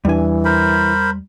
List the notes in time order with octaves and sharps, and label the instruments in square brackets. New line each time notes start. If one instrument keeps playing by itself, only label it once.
[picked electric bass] E2 D4 [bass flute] E3 [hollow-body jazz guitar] G3 G#5
[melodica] A#4 C5 B5